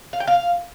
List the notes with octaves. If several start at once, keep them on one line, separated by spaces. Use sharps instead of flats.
F5
G5
F5